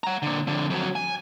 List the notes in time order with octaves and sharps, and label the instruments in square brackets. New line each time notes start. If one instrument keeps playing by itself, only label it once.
[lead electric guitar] F#5 A#5
A#2 D3
F2 D3
F2 F#3
G#5